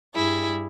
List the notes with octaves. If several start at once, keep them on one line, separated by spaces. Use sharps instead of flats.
G2 G3 E4 G#4